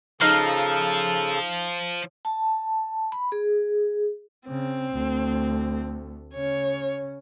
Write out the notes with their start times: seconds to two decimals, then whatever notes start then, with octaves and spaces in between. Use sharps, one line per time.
0.21 C#3 F3 D#4 A4 F5
2.25 A5
3.12 B5
3.32 G#4
4.48 C#3 C4
4.92 D2 A3
6.34 C#3 C#4 C#5